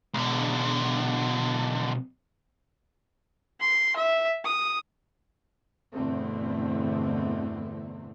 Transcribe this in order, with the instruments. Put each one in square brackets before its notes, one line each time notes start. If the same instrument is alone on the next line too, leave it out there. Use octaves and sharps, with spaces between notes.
[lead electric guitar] B1 D3 [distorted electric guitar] B2 G#3
[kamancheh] C6
E5
D#6
[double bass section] E2 G2 B2 D3 A3 C4